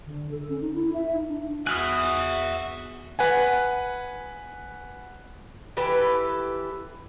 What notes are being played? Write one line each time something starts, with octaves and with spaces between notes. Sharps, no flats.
D3
A4
C#4
D#4
E4
E5
D#4
D4
E2 F#4 E5 G#5 D#6 F6 F#6
B4 F#5 G#5
E3 G4 A4 B4